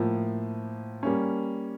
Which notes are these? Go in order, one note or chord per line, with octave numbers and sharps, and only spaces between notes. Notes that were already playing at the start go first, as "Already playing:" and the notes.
Already playing: A2 F3 A#3
G3 A#3 C#4